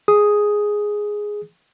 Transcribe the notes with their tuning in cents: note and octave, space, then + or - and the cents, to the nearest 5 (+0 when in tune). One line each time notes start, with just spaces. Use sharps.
G#4 +0 D#6 +0